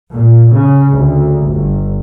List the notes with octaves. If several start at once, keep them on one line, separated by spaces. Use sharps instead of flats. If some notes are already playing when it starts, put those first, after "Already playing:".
A#2
C#3
D2
G1